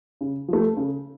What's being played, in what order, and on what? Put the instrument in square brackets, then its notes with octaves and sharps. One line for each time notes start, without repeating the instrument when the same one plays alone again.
[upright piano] C#3
F3 A3
C#3